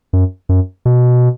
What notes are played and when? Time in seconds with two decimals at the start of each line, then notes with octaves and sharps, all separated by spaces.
0.13 F#2
0.49 F#2
0.85 B2